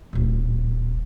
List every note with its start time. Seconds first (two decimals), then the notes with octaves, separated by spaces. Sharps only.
0.13 D1 A#1